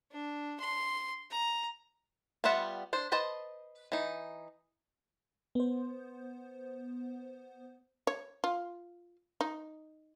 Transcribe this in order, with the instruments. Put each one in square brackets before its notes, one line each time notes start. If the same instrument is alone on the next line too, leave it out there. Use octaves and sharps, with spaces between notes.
[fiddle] D4
C6
A#5
[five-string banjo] G3 B3 F4 E5 F#5
D4 C5
B4 C5 D#5 A5
E3 D#4
[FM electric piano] B3 C5
[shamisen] C#5
F4
D#4